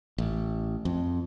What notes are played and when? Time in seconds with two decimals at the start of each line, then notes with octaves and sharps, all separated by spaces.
0.18 A1
0.85 F2